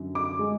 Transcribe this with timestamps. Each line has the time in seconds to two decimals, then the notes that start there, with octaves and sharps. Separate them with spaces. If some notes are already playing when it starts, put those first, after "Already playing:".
Already playing: F#2 D3 F#3
0.15 D6
0.39 G#3